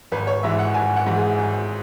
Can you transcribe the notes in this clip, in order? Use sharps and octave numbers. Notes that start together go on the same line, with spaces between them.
G#1 B4
C#5
G#2 E3 E5
F#5
G#1 G#5
F#5
G#2 E3
G#4
G#1